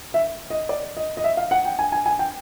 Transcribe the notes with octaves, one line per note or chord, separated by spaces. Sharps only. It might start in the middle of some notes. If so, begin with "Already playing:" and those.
E5
D#5
D5
D#5
D#5
E5
F5
F#5
G5
G#5
G#5
G#5
G5